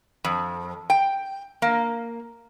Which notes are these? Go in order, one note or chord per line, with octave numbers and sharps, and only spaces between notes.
F2
G5
A#3